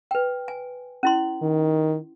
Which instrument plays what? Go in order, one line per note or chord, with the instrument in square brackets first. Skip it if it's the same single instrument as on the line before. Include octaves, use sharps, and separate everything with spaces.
[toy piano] B4 G5
G#5
C#4 E4 C6
[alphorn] D#3